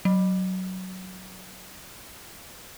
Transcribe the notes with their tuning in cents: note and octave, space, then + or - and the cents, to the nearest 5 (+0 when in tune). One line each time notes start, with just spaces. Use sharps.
F#3 +10